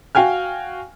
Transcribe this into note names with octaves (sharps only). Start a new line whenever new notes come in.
F#4 F5 G5 G#5 F6